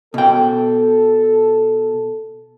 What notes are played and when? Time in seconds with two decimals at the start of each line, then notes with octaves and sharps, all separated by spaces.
0.14 B2 A4 G5